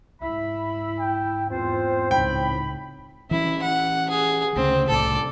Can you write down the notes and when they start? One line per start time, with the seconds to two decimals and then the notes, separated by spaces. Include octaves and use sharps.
0.22 G#2 E4 E5 B5
0.99 G5
1.51 E2 G#2 C4 F4 C5
2.11 C#2 A2 D#4 G5 B5
3.31 E3 C#4 E4
3.62 F#5
4.10 G#4
4.56 D2 C#3 C4
4.89 C2 A2 A4 D5